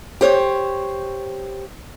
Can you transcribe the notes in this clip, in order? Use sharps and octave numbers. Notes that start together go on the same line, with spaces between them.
G4 C5 C#5